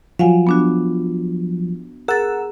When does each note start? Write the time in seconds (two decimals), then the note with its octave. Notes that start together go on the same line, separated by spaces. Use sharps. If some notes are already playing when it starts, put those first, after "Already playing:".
0.19 F3 F#3 F5 F#5 G#5
0.47 B3 D4 F#4
2.08 G#4 A#4 F#5 E6 A6